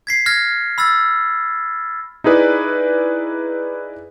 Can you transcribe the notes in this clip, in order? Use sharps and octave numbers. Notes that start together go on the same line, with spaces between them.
G#6 B6 C7
F6 G#6 A#6
B5 E6 F6 A6
D#4 E4 G#4 B4 D5